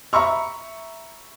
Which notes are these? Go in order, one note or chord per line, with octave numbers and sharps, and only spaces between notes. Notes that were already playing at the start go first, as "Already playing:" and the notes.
E5 A#5 B5 C#6 E6